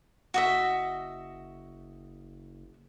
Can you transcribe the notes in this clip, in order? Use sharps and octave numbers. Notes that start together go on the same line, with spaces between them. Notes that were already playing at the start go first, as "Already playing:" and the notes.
F#1 F#4 D#5 E5